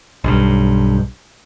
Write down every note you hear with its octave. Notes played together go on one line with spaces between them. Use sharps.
B1 G2